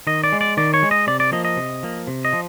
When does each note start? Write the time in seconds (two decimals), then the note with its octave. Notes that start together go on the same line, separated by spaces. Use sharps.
0.07 D#3 D#5
0.24 D5
0.32 G#3
0.41 D5
0.57 D#3 D5
0.74 C#5
0.83 G#3
0.91 D#5
1.07 C3 D5
1.20 D5
1.32 F3 A#3 D#5
1.45 D#5
1.57 C3
1.83 F3 A#3
2.07 C3
2.25 D#5
2.33 F3